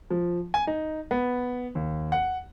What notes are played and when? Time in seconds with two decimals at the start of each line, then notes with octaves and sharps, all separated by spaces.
0.10 F3
0.54 G#5
0.67 D#4
1.11 B3
1.75 D#2
2.12 F#5